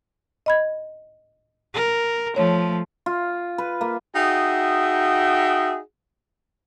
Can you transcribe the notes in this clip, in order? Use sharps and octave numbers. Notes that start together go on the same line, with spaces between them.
D#5 B5 G#6
A#4
F3 A3 C#5
F4
B4
A#3
D#4 F#4 G#4 E5 G5